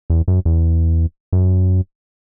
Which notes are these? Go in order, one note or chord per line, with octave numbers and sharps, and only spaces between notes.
E2
F#2
E2
F#2